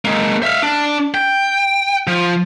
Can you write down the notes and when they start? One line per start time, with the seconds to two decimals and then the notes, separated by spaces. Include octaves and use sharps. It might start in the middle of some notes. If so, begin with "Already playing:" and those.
0.05 G#3 A#3
0.43 E5 F5
0.63 D4
1.14 G5
2.07 F3